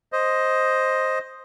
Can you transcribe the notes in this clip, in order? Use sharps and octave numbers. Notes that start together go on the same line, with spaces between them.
C5 D#5